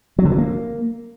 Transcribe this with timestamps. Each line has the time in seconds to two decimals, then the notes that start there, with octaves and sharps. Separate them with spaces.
0.19 F#3
0.25 D3
0.32 F#3
0.38 A#3